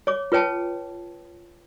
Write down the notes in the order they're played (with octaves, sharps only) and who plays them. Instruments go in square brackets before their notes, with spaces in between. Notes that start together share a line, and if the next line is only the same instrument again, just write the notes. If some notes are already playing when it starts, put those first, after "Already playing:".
[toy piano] C#5 D6
F4 B4 C#5 G5 A5